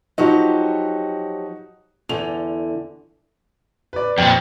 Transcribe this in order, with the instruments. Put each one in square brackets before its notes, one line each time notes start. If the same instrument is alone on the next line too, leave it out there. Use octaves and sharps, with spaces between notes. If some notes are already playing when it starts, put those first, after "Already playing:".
[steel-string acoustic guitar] F3 F#3 G4 [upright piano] D#4 F#4
[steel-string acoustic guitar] E2 D3 [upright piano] F7
[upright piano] B4 D5
[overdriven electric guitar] F2 A#2 [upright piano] G5